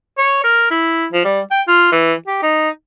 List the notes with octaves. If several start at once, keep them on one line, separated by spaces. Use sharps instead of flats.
C#5
A#4
E4
F3
G3
G5
F4
E3
G4
D#4